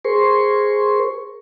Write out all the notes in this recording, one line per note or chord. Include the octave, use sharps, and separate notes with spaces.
G#4 A#4 C5 C6 C#6